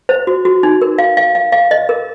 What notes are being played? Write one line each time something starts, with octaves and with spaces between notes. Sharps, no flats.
C5
F#4
F#4
D#4
A#4
F5
F5
F5
F5
D#5
A#4